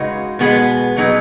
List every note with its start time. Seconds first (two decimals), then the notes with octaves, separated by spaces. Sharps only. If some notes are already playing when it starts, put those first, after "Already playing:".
Already playing: C#3 G#3 D#4 F#4 B4
0.39 B2 G#3 B3 G#4 B4
0.97 B2 F#3 D#4 G#4 B4